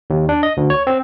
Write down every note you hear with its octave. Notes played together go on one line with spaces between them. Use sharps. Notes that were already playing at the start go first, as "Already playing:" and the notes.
D#2
D4
D#5
D2
C#5
C4